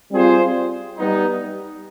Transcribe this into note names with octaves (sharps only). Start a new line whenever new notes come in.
G3 C4 F4 G#4 C5
G3 B3 D#4